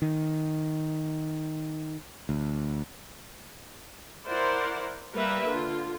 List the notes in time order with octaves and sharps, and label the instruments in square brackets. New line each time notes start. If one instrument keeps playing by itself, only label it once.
[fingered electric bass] D#3
D2
[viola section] E4 A#4 C5 D5 F#5
G3 A#3 A#4 B4 E5
D3 F4